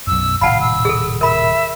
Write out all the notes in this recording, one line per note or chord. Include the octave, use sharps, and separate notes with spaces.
B1 F#2 E6
D#1 A2 C3 F5 F#5 A5 B5
E6
G#4 A4
A#4 E5 B5